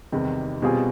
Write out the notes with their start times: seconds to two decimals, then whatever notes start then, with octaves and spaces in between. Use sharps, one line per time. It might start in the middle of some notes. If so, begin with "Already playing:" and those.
0.12 E2 C3 D#3 G3
0.62 B2 G3 C4 F4 G#4